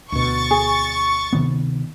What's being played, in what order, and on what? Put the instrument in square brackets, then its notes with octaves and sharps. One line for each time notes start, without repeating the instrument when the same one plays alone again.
[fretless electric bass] D2 B2 [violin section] C#6 A6
[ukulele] G#4
[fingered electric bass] C3 D#3 B3